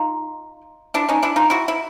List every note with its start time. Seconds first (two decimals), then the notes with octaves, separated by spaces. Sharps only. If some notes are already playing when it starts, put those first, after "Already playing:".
Already playing: D#4 F4
0.94 D4 E4
1.09 C#4 D#4
1.23 D4 E4
1.36 D#4 F4
1.50 E4 F#4
1.68 E4